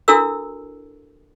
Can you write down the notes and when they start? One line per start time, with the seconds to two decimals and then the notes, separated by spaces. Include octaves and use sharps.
0.08 D4 E4 F#4 A4 A#4 E6